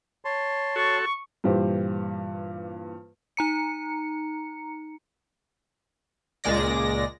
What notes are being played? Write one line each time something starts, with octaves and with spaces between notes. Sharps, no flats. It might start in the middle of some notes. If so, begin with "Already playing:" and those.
C#5 A5 C6
F#4 A4 C#6
G2 A#2 E3 G4 C5
D#4 A#5 C#7
C#2 A#2 G#3 D5 A#6